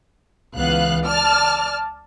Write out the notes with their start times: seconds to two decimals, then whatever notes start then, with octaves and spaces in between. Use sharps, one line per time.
0.56 C#2 E3 B3 F5 F#6
1.06 D5 A5 F6